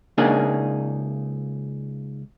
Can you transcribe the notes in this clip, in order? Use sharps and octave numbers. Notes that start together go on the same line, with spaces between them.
C#2 C#3 A#3 D4 D#4 G#4